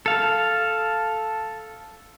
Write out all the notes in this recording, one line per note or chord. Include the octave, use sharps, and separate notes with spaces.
A4 F5